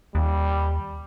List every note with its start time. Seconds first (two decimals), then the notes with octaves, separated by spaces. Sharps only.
0.15 D#2 G3